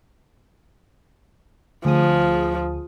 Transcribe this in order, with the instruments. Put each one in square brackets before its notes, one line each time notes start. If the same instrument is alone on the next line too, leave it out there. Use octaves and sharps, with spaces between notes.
[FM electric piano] D2 G#4 D#6 [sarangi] F3